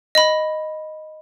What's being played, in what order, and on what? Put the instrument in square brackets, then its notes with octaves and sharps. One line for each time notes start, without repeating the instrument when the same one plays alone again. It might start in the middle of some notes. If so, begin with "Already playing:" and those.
[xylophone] D#5 B5